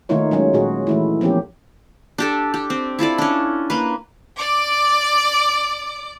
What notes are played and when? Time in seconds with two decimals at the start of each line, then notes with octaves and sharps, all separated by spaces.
0.09 D#3 A3 A#3 D#4 F4 C#5
0.31 F#3 G#3 C#4 F4
0.53 A#2 F4 F#4 G#4
0.87 E3 A3 E4
1.21 F3 A#3 B3 C#4 G4
2.18 D4 G4 A4
2.54 G4
2.70 C4
2.99 E4 F4 A4 D5
3.18 C#4 D4
3.70 A#3 B4
4.37 D5 D6